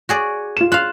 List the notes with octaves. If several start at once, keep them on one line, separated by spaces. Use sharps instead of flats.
F#4 G#4 D5
F4 E7
F4 F5 F#6